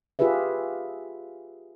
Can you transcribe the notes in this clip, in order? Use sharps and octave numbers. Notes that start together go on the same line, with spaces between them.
F4 G4 G#4 B4 E5